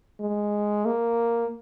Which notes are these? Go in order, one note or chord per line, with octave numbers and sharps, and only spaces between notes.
G#3
A#3